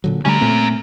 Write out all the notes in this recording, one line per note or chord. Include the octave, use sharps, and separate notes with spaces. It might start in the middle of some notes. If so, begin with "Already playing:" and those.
A#2 D3 F#3
D3 G3 A3 C#4 A#4
A#2 A3 C4